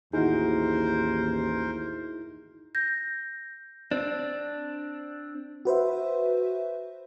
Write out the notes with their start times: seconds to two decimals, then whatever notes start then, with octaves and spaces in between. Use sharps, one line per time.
0.13 A1 D#2 D#4 E4 F#4 G#4 A#4 C5
2.75 G6 A#6
3.91 C4 D4
5.65 F#4 B4 C5 E5